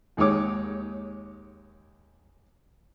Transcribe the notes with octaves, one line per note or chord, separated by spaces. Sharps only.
D#2 G#3 D#4 C#5 D6